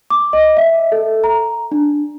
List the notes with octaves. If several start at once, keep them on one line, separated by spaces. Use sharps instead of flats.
D6
D#5
E5
A4
A#5
D4